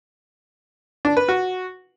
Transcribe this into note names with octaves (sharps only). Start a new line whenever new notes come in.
D4
B4
F#4